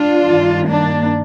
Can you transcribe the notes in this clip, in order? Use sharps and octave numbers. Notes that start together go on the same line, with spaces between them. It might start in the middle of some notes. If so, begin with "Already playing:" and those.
Already playing: D4 F4
G2 D#3
A#3 D4